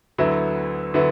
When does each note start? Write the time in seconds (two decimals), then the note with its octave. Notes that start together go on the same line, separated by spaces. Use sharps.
0.18 D2 D3 F#3 B3 E4
0.94 D3 F#3 B3 E4